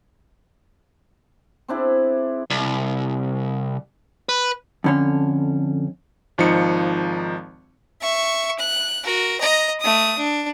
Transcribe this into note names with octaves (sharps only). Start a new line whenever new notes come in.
C4 D4 E4 G#4
C2
B4
F2 D3 C#4
G#1 F3 D#4 C#7
E5 C#6
F#6
F#4 A#4
D#5 A#5
A3 D#6
D4